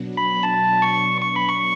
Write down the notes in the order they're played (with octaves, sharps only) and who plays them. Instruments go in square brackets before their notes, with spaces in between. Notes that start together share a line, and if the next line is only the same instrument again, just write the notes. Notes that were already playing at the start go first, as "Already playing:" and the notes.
Already playing: [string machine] B2 F#3 B3 D4
[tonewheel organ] B5
A5
C#6
C#6
B5
C#6